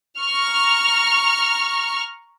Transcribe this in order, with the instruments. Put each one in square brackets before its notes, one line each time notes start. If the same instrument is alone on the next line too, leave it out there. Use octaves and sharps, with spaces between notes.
[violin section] A#5 C#6 F6